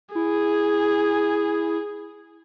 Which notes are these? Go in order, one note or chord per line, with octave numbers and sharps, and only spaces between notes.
E4 G#4